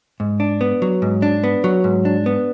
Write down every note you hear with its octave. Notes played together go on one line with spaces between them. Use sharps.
G#2
D4
B3
F#3
G#2
D4
B3
F#3
G#2
D4
B3